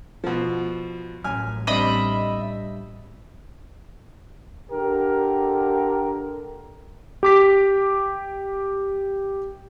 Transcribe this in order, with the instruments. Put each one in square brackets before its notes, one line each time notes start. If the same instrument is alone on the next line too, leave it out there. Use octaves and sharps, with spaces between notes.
[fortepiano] B2 F3
[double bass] A1 [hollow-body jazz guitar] F#2 [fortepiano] G#5 F6
[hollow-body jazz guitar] G3 C4 D4 [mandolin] D#5 E5 B5
[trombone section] D3 G4 A#4
[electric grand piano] G4 D6 B6